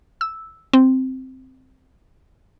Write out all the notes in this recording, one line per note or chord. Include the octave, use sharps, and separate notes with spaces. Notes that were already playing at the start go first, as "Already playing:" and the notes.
E6
C4